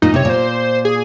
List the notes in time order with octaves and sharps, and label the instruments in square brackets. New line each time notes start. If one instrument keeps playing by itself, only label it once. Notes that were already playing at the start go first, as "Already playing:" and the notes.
[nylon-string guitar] A#2 [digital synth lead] D#4
[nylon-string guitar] C3 [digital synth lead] C#5
[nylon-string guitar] A#2 [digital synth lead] C5
[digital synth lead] G#4